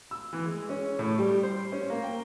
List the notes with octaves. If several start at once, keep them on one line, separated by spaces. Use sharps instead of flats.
E6
E3
G#3
C#4
A2
G3
C5
C#4
A#3
G5